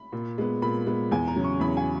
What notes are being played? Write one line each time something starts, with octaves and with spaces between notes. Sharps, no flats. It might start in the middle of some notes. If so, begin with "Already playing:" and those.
Already playing: B5
A#2
G#3 B3
A#2 B5
G#3 B3
E2 G#5
A#5
C#3 F#3 C#4
C#6
E2 B5
G#5